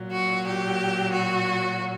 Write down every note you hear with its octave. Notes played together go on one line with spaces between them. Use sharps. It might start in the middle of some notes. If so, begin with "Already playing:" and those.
Already playing: A#2 F#3
F#4
G4
F#4